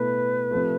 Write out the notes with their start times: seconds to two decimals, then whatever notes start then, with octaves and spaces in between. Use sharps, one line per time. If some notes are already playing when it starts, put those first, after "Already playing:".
Already playing: B2 A3 E4 B4
0.51 C3 F3 A3